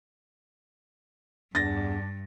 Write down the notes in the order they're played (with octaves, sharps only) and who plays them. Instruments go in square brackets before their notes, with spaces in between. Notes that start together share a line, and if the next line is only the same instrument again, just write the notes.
[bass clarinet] E2 [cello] G2 [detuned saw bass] D4 [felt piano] A6 A#6